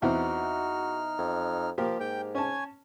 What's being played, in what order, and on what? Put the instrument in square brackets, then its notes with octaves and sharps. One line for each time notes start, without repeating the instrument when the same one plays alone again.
[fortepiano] E2 E3 C4 [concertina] D#4 F6 [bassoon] F#4
[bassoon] F2
[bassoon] F3 [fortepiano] A#3 G4 A#4
[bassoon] G#2 [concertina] G5
[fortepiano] C#4 A5 [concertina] C#5 G#5